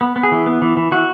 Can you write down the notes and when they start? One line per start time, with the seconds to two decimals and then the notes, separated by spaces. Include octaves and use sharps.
0.01 B3
0.16 B3
0.23 G#4
0.32 E3
0.46 B3
0.62 E3
0.77 E3
0.92 E3 F#4